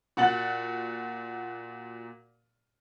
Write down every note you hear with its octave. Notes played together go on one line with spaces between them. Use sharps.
A#2 F#4 F#5 A6 F#7